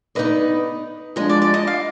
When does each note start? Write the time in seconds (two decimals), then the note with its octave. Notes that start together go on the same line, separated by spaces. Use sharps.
0.15 B3 D#4 B4 D5 D#5
1.16 F3 G#3 D4 G#4 D#5
1.29 D5
1.42 D5
1.54 D#5
1.67 F5